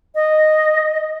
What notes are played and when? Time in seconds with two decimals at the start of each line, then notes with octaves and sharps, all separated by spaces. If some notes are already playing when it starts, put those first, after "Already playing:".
0.15 D#5